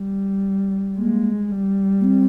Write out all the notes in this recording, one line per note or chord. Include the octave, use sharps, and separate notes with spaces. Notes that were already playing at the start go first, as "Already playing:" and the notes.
Already playing: G3
G#3 A#3
G3
A#3
C4